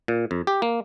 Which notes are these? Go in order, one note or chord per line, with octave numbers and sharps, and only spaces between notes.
A#2
F2
G4
A#3